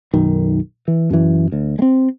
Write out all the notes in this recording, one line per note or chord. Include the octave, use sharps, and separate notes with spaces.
B1 F#2 D#3
E3
F#2 E3
D2
G#3 C4